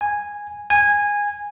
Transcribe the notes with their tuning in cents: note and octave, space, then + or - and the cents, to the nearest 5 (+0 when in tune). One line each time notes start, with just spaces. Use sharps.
G#5 -10
G#5 -15